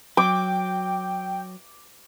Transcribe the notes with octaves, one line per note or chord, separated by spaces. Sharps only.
F#3 G5 D6